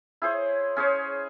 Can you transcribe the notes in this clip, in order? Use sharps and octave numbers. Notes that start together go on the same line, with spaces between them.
E4 G#4 C5 C#5
C#4 G#4 C5 C#5